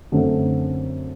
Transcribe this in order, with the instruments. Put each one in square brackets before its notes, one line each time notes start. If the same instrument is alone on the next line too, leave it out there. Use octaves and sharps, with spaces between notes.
[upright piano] F#2 D3 A3 C4